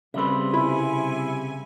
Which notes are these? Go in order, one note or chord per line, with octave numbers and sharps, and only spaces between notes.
C#3 G3 C4 B4 E5
C3 E4 G#5